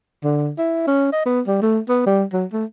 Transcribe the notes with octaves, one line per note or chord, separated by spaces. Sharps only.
D3
E4
C#4
D#5
B3
G3
A3
B3
G3
F#3
A3